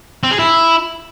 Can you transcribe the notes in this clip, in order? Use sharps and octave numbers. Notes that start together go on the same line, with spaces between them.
C4
G#4
E4